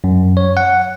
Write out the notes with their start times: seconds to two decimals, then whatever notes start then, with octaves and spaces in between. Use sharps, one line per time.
0.04 F#2
0.37 C#5
0.57 F#5